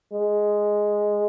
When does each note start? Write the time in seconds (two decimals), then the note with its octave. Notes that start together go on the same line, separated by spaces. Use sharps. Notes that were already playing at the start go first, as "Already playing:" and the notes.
0.12 G#3